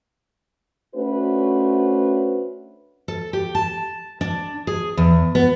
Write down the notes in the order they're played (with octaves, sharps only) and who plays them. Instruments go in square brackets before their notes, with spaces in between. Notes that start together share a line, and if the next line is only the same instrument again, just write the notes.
[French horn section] A3 C#4 D4 F#4 B4 C5
[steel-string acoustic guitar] A4
G4
A5
D4
G#4
E2
B3